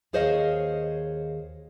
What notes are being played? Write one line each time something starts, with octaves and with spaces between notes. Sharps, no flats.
D#2 G#4 C5 C#5 D#5 F5